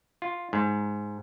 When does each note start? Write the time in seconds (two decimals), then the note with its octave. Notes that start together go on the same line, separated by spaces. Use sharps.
0.22 F4
0.53 G#2